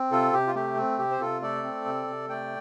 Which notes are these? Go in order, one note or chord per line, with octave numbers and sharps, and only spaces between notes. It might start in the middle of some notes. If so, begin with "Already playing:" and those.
Already playing: C4
C3 F4 A4
C3 G4
F4
A3 G4
C4
C3 G4
C5
C3 F4 A4
A3 A4 D5
C4
C3
C3
A3 D5 G5